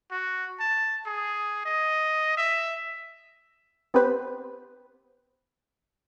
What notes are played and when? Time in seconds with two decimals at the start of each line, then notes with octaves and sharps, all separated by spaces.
0.12 F#4
0.60 A5
1.07 G#4
1.65 D#5
2.37 E5
3.94 B3 C4 G4 B4 C5